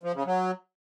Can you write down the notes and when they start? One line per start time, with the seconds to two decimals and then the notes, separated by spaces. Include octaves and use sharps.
0.03 F3
0.15 C#3
0.26 F#3